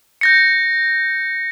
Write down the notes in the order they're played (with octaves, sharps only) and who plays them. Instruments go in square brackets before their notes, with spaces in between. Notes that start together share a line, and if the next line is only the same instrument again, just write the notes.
[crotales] G6 A#6 C#7